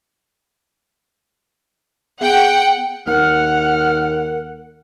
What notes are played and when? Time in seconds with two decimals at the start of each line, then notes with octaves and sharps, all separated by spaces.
2.21 B3 G#4 F#5 G5
3.07 D#2 A#4 F#5 F6